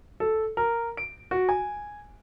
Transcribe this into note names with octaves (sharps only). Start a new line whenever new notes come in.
A4
A#4
D7
F#4
G#5